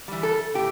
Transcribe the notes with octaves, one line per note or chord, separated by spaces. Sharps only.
E3 G3
A4
A2 G4